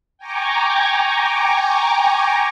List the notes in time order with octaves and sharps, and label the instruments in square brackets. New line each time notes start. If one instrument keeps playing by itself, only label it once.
[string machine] G5 G#5 A#5 C#6 D6